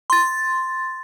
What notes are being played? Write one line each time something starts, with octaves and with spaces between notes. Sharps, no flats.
C6 A6